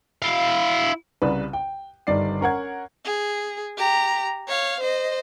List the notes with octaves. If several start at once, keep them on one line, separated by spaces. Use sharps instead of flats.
E4 F5
C2 C#3 G3 B4
G5
G1 D#3 G3 D5 D#5 C7
C#4 A#4 F#5 G#6
G#4
G4 A#5
C#5 F5
C5 D#5